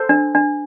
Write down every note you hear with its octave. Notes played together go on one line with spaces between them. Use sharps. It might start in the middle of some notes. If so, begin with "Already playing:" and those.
Already playing: A4 C5
D4
D4